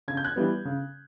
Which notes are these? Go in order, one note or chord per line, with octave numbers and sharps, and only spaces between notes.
C#3 G#6
G6
F#6 G#6
E3 G3 B3
C#3